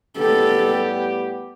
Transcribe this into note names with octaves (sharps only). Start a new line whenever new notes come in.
A2 G3 B3 G4 A4